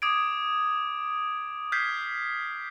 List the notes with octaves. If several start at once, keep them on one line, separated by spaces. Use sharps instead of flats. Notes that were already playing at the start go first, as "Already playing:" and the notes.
D6 D#6 G#6 D7
F6 G6 G#6 B6 C7